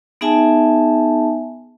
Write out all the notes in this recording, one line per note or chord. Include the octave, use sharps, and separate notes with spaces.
B3 D#4 G#4 E5 G#5 A5